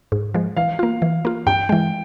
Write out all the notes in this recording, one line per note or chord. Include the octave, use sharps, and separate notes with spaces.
G#2
F3 G#3
E3 F5
A#3 F4
E3
A#3 F4
G2 G5
E3 G#3